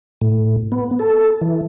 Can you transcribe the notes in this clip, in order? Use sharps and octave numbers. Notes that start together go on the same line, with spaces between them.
A2
B3
A4
E3